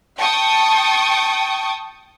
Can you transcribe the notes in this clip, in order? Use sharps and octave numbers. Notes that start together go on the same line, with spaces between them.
G5 A5 C#6 D#6